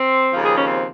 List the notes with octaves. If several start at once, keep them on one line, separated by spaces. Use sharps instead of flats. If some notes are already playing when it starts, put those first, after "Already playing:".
Already playing: C4
D#2 C#3 F3
G#4
C#4
C4